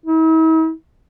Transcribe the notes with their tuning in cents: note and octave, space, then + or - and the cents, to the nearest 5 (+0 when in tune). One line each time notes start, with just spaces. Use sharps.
E4 -45